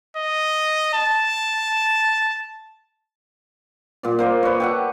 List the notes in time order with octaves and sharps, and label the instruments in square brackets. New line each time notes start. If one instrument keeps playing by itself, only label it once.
[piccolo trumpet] D#5
A5
[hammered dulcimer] A#2 D5
A#3 C5 D#5
B4 C#5
G4 A4 F#5